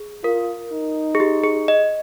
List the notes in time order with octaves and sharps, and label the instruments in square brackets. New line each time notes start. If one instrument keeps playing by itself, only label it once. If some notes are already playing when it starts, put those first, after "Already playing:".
Already playing: [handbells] G#4
[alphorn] F4 [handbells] A#4
[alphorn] D#4
[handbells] G#4
G4
G#4
D#5